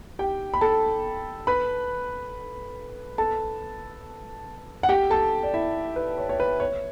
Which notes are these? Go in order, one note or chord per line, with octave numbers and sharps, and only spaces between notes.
G4 G5
B5
A4 A5
B4 B5
A4 A5
F#5
G4 G5
A4 A5
D5
E4 E5
B4
C#5
C#5
B4
C#5